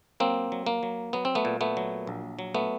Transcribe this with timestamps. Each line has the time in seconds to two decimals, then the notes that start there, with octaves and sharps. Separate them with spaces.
0.20 F#3 A#3 C4
0.52 F#3
0.67 A#3
0.83 F#3
1.13 F#3 B3
1.25 C4
1.35 A3 B3
1.45 A#2
1.61 A3 B3
1.77 F#3
2.07 A#1
2.39 F#3
2.55 A3 B3